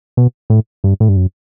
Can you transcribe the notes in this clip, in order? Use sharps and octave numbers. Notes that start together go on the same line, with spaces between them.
B2
A2
G2
A2
G2
F#2